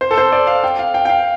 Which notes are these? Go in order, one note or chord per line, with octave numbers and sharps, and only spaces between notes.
C5
A4
C5
D5
F5
G5
F5
G5
G5
F5